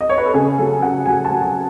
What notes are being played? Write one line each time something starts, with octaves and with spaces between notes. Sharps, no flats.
D#5
C#5
B4
A4
C#3 G#4
F#3 A4
C#3 F#5
F#3 G#5
A5
F#3
A5